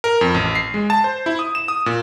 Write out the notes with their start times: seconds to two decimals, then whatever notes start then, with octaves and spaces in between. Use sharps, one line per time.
0.04 A#4
0.21 F2
0.34 A1
0.55 C7
0.74 G#3
0.90 A5
1.04 C5
1.26 E4
1.39 D#6
1.55 E7
1.68 D#6
1.86 A#2